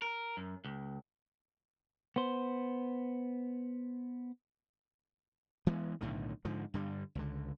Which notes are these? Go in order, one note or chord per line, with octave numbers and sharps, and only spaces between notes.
A#4
F#2
C#2
B3 C5
E3 G#3 B3
B1 A2 D3 D#3
G#2 D3 F3
G2 D3 G3
C#2 D3